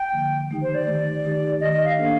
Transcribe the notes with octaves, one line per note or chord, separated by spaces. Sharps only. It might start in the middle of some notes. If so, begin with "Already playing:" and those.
Already playing: G5
D3 F3 A#3
D#3 A3 D#4 G4
C5
D5
D#3 A3 D#4 G4
D#3 A3 D#4 G4
D#3 A3 D#4 G4 D#5
D#5
F5
A#3 D4 A4 C5 F5